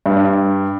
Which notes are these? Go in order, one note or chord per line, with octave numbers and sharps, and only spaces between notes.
G2